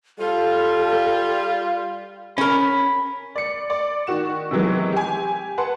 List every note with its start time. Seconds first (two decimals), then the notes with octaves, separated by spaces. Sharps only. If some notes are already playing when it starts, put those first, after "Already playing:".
0.19 G3 F4 A4
2.38 C#4 A#4 B5
3.35 D5 C#7
3.70 D5
4.07 D#3 F#4 E7
4.51 C3 D#3 E3 F#3 G#3 B3
4.92 G4 G#5
5.58 B4 F#5 A5 C6